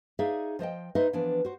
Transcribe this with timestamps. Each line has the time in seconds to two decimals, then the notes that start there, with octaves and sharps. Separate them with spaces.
0.19 D#4 G#4 D5 E5 F5
0.59 F3 C5 D#5 G5
0.95 D#4 B4 C5 D#5 E5
1.13 E3 F3 B3 D4
1.45 F#4 C5